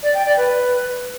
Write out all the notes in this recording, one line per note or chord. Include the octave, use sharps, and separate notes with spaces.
D5
G5
D5
B4